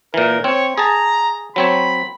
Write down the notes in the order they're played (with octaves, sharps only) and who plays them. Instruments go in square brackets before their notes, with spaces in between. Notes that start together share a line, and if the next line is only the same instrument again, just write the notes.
[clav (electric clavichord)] A#2 E3 [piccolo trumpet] A#4
[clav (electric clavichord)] C4 [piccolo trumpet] C#5
[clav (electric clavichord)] G#4 A5 [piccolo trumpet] A#5
[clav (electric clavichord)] F#3 C4 C#5 [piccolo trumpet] B5